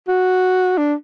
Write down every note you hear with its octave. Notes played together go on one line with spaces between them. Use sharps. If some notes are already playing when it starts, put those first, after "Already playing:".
F#4
D4